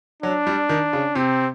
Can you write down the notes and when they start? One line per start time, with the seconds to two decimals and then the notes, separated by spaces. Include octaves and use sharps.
0.23 F#3 D4
0.47 G3
0.69 D#3
0.93 C#3
1.15 C3 C4